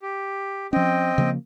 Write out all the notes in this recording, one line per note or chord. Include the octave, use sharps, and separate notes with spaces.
G4
F3 C4 C#4 D#5 G5
C#3 F3 A#3